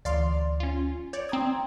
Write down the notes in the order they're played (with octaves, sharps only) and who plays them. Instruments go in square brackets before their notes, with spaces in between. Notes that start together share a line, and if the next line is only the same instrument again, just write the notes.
[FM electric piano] D2 E3 [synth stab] D5 F5 C6
[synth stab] C#4 F4
[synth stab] C#5 D5 [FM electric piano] G6
[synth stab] C4 D#6 [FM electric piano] A#5 G#6